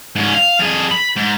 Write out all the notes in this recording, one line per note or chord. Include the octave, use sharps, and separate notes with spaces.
G#2 C#4
F5
F2 G#4
B5
G#2